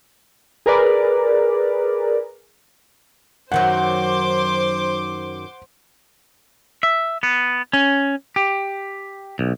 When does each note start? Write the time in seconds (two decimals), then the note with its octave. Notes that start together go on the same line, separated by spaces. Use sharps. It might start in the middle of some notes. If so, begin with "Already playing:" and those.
0.66 G#4 A#4 B4 D5
3.52 F#2 D#3 F#3 C5 F#5 C6 D6
6.83 E5
7.23 B3
7.73 C#4
8.36 G4
9.39 B1